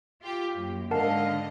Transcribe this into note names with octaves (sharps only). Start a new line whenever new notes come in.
F4 G4
F#2 A#3
G#2 D3 A#4 D#5 F5 F#5 A5